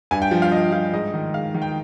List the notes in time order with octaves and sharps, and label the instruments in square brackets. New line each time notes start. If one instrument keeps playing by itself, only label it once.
[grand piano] G2 G#5
G5
F3
F5
G2 D#5
F3 F5
G#2 D#5
D#3
G#2 F5
D#3
G5